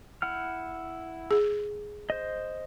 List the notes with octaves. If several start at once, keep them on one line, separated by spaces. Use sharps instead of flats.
E4 F#5 F6
G#4
C5 D#5